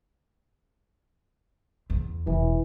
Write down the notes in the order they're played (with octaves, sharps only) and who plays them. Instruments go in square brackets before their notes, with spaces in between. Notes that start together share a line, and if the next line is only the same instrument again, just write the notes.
[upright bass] E2
[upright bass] E1 [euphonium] E3